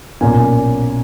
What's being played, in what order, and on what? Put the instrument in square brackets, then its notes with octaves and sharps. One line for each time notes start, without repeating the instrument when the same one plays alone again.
[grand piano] B1 A#2 A#3 C#4 G#5